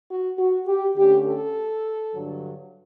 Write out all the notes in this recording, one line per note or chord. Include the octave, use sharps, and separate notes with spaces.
F#4
F#4
G4
D3 A3 C#4 G4
A4
G2 D3 F#3